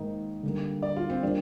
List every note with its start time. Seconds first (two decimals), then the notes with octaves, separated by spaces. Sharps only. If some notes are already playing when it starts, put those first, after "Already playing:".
Already playing: G#2 D#3 A#3 D#4
0.43 D3 G3 A#3
0.83 D5
0.97 F4
1.10 C4
1.23 D#3 G3 A#3 D4